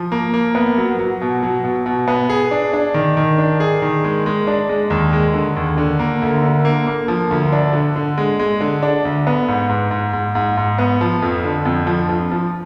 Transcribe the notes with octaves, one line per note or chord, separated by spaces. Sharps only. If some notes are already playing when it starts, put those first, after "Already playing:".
Already playing: F3
A#3
A#3
B3
F#3
F#3
B2
F#3
B2
B2
B3
G#4
D4
D4
D#3
D#3
D4
G#4
D#3
G#3
G#3
D4
G#3
D#2
G#3
D3
D#2
D3
A#3
D2
D3
A#3
A#3
F3
D2
D4
D3
D3
G#3
G#3
D3
D4
D2
B3
G#2
G#2
G#2
G#2
G#2
G#2
B3
F3
F2
D3
F2
F3
F3
F3